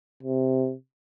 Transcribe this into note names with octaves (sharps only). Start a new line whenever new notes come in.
C3